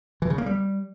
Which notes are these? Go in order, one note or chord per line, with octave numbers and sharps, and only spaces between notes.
E3
C#3
A#3
G3